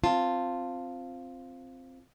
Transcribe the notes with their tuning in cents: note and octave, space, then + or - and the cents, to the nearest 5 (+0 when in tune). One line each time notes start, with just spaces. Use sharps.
C4 +0 F4 +0 A5 +15